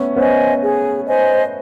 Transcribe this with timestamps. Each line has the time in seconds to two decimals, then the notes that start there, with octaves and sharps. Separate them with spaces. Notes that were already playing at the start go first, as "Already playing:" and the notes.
Already playing: A3 B3 C#4
0.16 B3 C#4 C5 D#5 G#5
0.62 G#4
1.07 C5 D#5 G#5